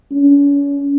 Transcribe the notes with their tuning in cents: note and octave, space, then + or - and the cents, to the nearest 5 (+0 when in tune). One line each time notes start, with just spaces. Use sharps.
C#4 +40